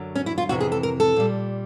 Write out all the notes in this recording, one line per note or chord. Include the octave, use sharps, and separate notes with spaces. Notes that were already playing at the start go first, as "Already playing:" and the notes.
Already playing: F#2 D3 F#3
C#4
E4
F4
F2 C3 E3 F#4
G#4
A4
A#4
A4
A#2 G3